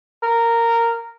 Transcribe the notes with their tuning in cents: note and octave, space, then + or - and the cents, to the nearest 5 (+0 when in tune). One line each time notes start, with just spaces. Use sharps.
A#4 -10